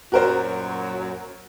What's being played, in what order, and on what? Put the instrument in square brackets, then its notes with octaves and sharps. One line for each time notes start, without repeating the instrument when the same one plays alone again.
[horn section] F#2 A#2 F#3 [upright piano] F#4 A#4 C5